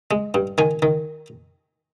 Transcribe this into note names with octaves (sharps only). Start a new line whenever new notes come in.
G#3
G2
D#3 G#5
D#3